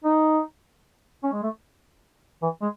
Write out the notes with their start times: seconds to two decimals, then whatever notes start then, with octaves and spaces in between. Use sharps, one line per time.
0.04 D#4
1.23 C#4
1.33 G#3
1.43 A3
2.42 E3
2.62 G#3